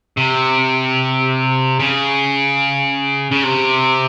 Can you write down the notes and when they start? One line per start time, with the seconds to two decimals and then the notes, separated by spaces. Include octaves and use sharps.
0.17 C3
1.80 C#3
3.31 C#3
3.43 C3